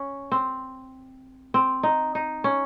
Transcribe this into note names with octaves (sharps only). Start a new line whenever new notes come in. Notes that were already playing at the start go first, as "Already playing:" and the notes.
Already playing: C#4
C4
C4
D#4
D#4
C#4